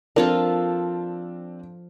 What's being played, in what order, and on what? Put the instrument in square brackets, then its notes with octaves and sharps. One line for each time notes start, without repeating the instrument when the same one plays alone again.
[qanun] F3 F4 A4 [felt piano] C4 D4 [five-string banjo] A#4